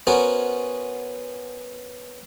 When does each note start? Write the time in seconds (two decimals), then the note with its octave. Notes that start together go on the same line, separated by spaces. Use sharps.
0.07 B3 C#4 F#4 A#4 C5